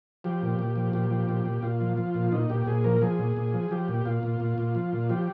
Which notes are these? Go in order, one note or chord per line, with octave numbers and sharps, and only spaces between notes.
F3 G4
A#2
A#2
F3
A#2 G4
F3
A#2
A#2
A#2 F4
F3
F3
A#2
A#2 D#4
A#2 G4
A#2 G#4
F3 A#4
F3 G#4
A#2
A#2
F3
F3 G4
A#2
A#2 F4
A#2
A#2
A#2
F3
A#2
F3 G4